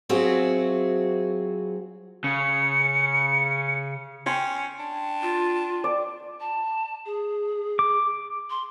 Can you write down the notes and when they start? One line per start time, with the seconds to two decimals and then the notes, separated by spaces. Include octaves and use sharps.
0.09 F#3 C4 F4 F#4 G#4 E5
2.24 C#3 C#7
4.26 C#4 G5 C6
4.79 D4
5.22 F4
5.84 D5
6.40 A5
7.06 G#4
7.79 D6
8.50 C6